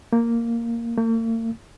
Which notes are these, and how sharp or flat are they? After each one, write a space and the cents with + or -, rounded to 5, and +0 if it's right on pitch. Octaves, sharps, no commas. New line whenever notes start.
A#3 -5
A#3 -45